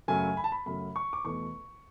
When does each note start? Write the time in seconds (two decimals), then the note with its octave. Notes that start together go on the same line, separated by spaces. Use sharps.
0.08 F#2 C#3 F#3 A3 G#5
0.37 B5
0.44 A5
0.52 B5
0.66 F#2 C#3 F#3 A3 B5
0.96 C#6
1.13 D6
1.24 E2 B2 A3 C#6